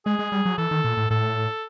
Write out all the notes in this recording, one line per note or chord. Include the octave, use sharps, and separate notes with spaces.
G#3 G#4
G#3
G3
F#3
E3 A4
D#3
A#2
A2
A2 A4